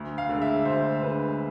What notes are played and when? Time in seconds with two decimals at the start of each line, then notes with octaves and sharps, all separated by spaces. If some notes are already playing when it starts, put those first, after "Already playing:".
Already playing: D2
0.18 F5
0.29 D3
0.34 G#3
0.42 E5
0.65 D2 C5
1.02 D3 G#3 B4